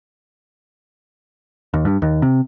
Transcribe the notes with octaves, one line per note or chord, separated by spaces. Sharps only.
D#2
G2
D#2
C3